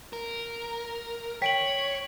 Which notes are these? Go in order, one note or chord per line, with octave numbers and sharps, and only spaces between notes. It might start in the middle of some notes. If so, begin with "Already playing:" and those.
A#4
C#5 G5 B6 D7 F#7